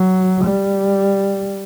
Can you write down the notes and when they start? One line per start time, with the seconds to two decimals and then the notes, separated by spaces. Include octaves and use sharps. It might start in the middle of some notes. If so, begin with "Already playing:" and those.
Already playing: F#3
0.44 G3